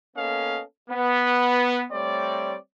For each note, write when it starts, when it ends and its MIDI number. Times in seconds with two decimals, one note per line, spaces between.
0.16 0.62 58
0.16 0.62 59
0.16 0.62 61
0.16 0.62 69
0.16 0.62 75
0.16 0.62 77
0.90 1.85 59
1.91 2.55 55
1.91 2.55 57
1.91 2.55 60
1.91 2.55 73
1.91 2.55 74